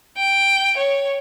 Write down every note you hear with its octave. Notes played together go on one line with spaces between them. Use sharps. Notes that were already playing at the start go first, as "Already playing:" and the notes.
G5
C#5